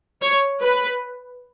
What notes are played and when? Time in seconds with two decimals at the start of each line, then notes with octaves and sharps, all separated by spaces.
0.22 C#5
0.62 B4